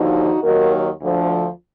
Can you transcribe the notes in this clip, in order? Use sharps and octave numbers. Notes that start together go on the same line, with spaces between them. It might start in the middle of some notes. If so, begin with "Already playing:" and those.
Already playing: D#2 D3 F3 D#4 F#4
D#2 D#3 F#3 F#4 A#4
D2 D3 F3